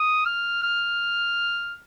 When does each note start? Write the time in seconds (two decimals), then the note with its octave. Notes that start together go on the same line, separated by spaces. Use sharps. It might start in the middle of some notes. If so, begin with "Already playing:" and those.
Already playing: D#6
0.25 F6
0.63 F6